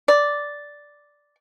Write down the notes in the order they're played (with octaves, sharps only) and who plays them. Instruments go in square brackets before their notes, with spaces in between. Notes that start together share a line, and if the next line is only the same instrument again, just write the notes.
[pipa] D5